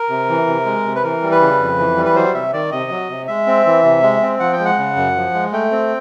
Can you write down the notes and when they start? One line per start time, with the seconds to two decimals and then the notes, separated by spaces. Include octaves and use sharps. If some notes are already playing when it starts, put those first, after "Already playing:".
Already playing: A#4
0.09 C3
0.29 E3
0.47 C3
0.65 G#3
0.85 C3
0.95 B4
1.03 E3 A#4
1.22 G3
1.31 B4
1.41 C#3
1.59 F2
1.79 E3
1.97 G3
2.05 B4
2.15 F#3 C5
2.34 C3 E5
2.53 D#3 D5
2.72 C3 D#5
2.91 F#3
3.09 C3
3.27 G#3 E5
3.47 C4
3.66 E3
3.84 C3
4.02 G#3
4.22 C4
4.40 F3 F#5
4.53 G5
4.59 G#3
4.65 F#5
4.78 C#3
4.96 F#2
5.16 F3
5.34 G#3
5.52 A3 G5
5.71 C4